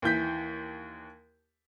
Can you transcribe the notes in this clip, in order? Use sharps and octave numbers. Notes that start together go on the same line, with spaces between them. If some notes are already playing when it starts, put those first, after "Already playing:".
D#2 E3 G6 B6